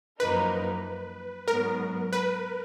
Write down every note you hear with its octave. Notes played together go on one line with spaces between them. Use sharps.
F#2 F3 A#3 D#4 A#4 B4
G#2 F#3 B3 A#4
B4